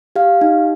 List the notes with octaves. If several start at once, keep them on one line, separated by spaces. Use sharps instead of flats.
G4 F5
D#4